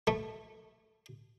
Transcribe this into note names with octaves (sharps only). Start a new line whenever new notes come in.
A3